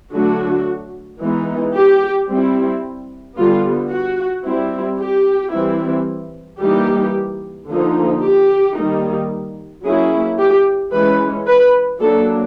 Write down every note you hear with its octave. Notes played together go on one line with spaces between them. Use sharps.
D3 F#3 A3 D4 F#4
E3 G#3 B3 D#4
G4
G3 C4 E4
D3 G3 B3 F4
F#4
G3 C4 E4
G4
E3 G3 C4 E4
E3 G3 A#3 D#4 G4
D3 F3 A#3 D#4
G4
D#3 G3 A#3 D#4
F#3 A#3 C#4 E4 G#4
G4
E3 G#3 C#4 B4
B4
F#3 A#3 D4 A4